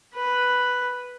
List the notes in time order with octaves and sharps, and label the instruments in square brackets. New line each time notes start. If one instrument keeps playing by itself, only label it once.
[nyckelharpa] B4